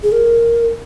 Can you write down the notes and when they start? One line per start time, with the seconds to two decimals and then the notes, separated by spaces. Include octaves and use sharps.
0.03 G#4
0.12 A#4